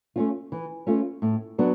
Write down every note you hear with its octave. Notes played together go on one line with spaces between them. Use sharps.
A3 C#4 F4
E3
A3 C#4 F4
A2
F#3 B3 D4